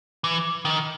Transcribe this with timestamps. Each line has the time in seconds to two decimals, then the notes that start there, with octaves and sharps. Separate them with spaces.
0.24 E3
0.65 D#3